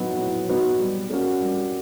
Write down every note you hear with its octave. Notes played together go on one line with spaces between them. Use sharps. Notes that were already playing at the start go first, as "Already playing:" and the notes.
Already playing: A2 F#3 B3 D#4 F#4
A2
F#3 B3 D#4 F#4
G3
A#3 C#4 F#4
G3